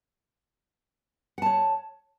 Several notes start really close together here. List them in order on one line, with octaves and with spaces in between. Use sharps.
F#5 A5 C#5